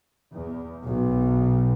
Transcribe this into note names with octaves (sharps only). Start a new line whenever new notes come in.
E2
B1